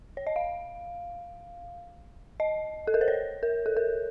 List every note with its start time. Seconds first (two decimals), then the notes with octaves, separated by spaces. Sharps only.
0.17 C#5
0.27 D#5
0.36 F5
2.40 D#5
2.87 A4
2.94 A#4
3.01 C5
3.08 C#5
3.43 A#4
3.66 A4
3.77 A#4